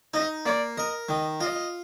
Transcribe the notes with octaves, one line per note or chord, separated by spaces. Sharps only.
D#4 D#5
A#3 D5
A#4 D#5
D#3 D#5
F4 D#5